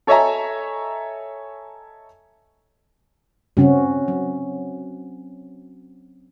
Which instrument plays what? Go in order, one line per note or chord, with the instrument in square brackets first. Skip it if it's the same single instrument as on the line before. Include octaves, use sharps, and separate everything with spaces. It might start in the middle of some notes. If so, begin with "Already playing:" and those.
[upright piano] A4 C#5 D#5 E5 G#5 A#5
[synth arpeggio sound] G2 C#3 [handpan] C4 C#4 F#4
[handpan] F#3